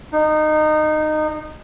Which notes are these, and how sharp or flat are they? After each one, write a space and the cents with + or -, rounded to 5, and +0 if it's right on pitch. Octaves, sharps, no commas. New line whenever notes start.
D#4 -20